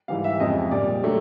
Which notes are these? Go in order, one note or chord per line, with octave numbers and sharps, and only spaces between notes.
G#2 E3 G3 F5
E5
F2 C#3 F3 G#3 D#5
A#2 G3 D5
D3 F#3 A3